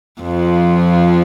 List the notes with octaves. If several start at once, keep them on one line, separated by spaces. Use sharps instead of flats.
F2 F3